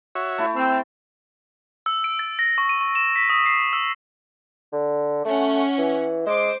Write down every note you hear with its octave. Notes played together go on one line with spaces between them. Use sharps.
F#4 C#5 E5
A3 E4
C4 E6
E6
D7
A6
A#6
C#6
D#7
C#6
E7
B6
D#6
C7
E6
D3
A3 C#4 F#5
E3
G#3 C5 D6